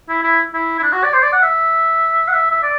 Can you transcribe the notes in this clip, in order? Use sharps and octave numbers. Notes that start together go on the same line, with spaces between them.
E4
E4
E4
E4
D4
F#4
D5
C5
D5
F#5
E5
F#5
E5
E5
D5